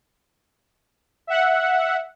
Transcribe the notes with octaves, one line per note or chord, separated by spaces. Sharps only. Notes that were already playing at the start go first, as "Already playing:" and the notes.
E5 F#5